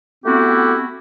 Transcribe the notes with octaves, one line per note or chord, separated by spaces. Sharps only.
A3 B3 C4 E4 F#4 G4